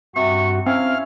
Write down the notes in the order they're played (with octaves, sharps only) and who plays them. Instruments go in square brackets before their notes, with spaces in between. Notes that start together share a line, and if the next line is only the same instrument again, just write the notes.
[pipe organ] G2 F#4 [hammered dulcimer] C3 [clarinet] C#6
[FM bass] C4 [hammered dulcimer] C#4 E4 [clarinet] F5 [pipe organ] F6